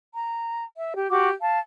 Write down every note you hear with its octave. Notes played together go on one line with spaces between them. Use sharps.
A#5
E5
G4
F#4 G4 D6
F5 A5